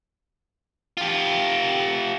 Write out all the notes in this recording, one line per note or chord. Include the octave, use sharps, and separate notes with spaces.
F4 G4